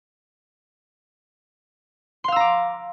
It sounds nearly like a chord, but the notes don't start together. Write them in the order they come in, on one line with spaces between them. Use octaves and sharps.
C6 F5 E6 A#5 D6